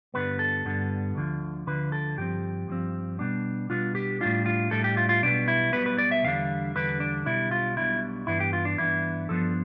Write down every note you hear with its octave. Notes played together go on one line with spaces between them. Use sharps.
G2 D3 G3 B3 B4
A4
G2 D3 G3 B3
D2 D3 F3
D2 D3 F3 B4
A4
G2 F3 C4 G4
G2 F3 C4
B2 G3 B3 D4
B2 G3 B3 D4 F4
G4
A2 G3 D4 F4
F4
A2 G3 D4 A4
G4
F4
F4
B1 B2 G3 B3 D4
E4
B1 B2 G3 B3 B4
B4
D5
E5
E2 D3 G3 D4 F5
E2 D3 G3 D4 B4
D4
B1 B2 G3 D4 E4
F4
B1 B2 G3 D4 E4
G2 E3 B3 D4 E4
G4
F4
D4
G2 E3 B3 D4 E4
G2 F3 B3 D4 A4